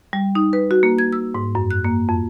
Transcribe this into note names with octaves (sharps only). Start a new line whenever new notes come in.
G3
D#4
B4
F#4
A#3
G#6
E6
G#2
F#2
F#6
A#3
F2